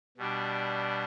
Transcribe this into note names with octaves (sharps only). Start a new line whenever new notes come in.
B2 G3 D4